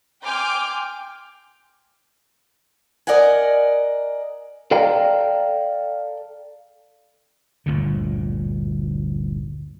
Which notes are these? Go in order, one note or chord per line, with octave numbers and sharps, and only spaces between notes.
G5 G#5 C6 D6 F6 G6
A#4 D5 D#5 F#5 G#5
A4 D5 F5 G5 A#5
G1 D2 A#2 D3